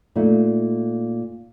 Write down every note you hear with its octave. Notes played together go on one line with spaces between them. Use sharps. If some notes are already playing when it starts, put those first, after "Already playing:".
A#2 A3 D#4